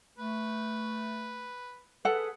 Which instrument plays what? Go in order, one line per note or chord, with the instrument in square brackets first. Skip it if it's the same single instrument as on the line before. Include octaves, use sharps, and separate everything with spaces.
[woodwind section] A3 [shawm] B4
[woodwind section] G#4 B4 [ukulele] A4 F#5